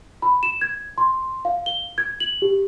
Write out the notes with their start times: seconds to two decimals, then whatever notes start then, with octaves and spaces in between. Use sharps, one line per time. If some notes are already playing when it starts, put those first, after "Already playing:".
0.22 B5
0.43 E7
0.61 G#6
0.98 C6
1.45 F5
1.66 G7
1.98 G#6
2.20 F#7
2.42 G4